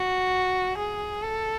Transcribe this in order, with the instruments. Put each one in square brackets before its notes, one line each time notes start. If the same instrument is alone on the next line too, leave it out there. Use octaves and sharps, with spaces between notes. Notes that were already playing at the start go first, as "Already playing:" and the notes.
Already playing: [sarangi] F#4
G#4
A4